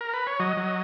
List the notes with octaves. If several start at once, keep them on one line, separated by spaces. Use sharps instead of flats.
A#4
B4
C#5
F#3 D#5
F#3